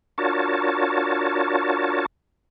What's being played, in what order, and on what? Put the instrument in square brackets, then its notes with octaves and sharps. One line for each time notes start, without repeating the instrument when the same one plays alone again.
[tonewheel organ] D4 F4 F#4 A#4 C#5 A5